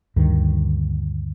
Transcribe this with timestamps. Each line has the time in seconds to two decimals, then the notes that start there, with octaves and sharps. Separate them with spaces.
0.16 D2 G2 D#3